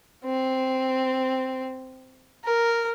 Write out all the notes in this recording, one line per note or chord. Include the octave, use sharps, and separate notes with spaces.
C4
A#4